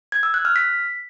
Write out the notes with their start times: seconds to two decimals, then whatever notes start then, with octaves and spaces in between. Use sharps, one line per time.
0.12 G#6
0.23 E6
0.34 F#6
0.45 F6
0.56 B6